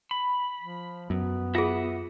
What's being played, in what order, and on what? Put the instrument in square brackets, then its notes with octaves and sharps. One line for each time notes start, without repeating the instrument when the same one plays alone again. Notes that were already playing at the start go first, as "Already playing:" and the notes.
[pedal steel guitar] B5
[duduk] F3
[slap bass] F#2 [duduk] B3
[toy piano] F4 G#4 [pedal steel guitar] E5 F#5 D#6